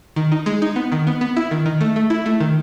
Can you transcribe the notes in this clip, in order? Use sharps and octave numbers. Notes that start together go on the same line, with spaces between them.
D#3
D#4
G#3
D#4
B3
D#3
B3
B3
E4
D#3
D#3
A3
A3
E4
A3
D#3